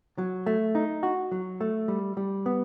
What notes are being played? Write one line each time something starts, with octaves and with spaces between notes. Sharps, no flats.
F#3
A3
D#4
F#4
F#3
A3
G3
G3
B3